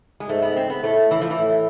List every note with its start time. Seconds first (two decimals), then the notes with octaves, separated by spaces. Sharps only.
0.20 G#3
0.29 G#2 A3
0.42 B3
0.56 C4
0.70 B3
0.83 A2 A3
1.11 E3
1.21 F3
1.30 E3
1.39 A2